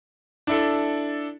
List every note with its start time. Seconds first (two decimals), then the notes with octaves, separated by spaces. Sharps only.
0.47 D4 E4 A4